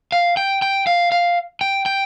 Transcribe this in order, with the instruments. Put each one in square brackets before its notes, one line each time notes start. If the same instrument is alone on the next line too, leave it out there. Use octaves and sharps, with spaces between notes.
[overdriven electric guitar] F5
G5
G5
F5
F5
G5
G5